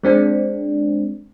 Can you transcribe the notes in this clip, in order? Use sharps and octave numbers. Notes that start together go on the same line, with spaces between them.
G#3 C4 D4